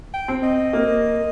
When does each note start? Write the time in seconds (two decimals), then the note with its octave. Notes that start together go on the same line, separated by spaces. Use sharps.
0.14 G5
0.28 C4
0.43 D#5
0.73 A#3